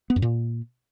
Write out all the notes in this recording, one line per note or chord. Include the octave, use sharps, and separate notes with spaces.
B3
F#2
A#2